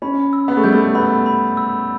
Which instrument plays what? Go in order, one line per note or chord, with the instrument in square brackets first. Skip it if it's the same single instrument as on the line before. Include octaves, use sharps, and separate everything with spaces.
[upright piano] C#4 [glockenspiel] B5
[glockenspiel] E6
[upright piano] B3
A3
[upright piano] G3 [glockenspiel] G6
[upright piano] A3
[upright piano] B3 [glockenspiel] B5
[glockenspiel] B5
E6